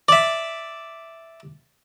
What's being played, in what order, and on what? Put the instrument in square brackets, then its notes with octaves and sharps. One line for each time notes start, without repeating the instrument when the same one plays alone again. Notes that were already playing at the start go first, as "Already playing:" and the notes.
[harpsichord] D5 E5